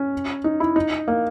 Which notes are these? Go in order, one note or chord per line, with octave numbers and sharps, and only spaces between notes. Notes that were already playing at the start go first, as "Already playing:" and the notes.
Already playing: C#4
D#4
E4
D#4
A#3